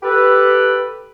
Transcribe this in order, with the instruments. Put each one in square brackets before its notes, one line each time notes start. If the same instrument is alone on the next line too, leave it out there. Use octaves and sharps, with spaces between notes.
[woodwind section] G4 A4 B4